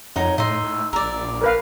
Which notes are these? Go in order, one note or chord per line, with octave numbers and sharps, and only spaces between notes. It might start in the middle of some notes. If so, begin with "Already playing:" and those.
F2 D#4 A#4 C#5 F#5
A2 D#4 C6 E6
A2
A#1 A#4 D5
A#4 B4 F5